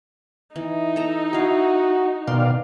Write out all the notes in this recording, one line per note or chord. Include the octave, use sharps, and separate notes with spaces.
E3 D#4
A4 A#5
E4 F#4 F5
B2 D#3 D5 F5 C6